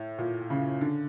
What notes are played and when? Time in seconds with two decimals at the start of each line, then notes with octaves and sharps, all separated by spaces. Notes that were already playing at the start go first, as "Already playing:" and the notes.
Already playing: A2
0.18 A#2
0.50 C#3
0.81 D3